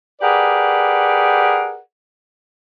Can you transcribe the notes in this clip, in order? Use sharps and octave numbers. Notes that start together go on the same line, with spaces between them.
G4 G#4 A#4 B4 D5 F#5